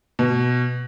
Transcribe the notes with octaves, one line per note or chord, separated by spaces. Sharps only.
B2